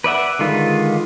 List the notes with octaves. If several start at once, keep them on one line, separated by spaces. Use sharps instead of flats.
B4 D5 E5 F#5
D3 D#3 G#3 F4 B4